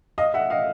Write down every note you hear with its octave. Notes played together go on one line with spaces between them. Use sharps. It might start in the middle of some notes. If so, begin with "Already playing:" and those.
D#5 F5
E5 F#5
D#5 F5